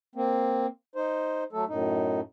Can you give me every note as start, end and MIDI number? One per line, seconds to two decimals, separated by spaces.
0.15 0.66 58
0.15 0.66 60
0.96 1.44 63
0.96 1.44 72
1.53 1.65 54
1.53 1.65 57
1.53 1.65 69
1.68 2.21 42
1.68 2.21 45
1.68 2.21 63